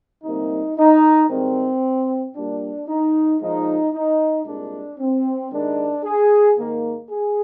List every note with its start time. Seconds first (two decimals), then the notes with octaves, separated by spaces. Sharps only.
0.24 D2 C3 G3 A#3 D#4
0.77 D#4
1.29 G2 D#3 G#3 C4
2.34 A#2 G3 A#3 D4
2.88 D#4
3.40 A#2 F3 G#3 D#4
3.92 D#4
4.46 C2 A#2 G#3 D4
4.99 C4
5.51 D#2 D#3 G#3 D4
6.04 G#4
6.57 G#2 D#3 A#3
7.10 G#4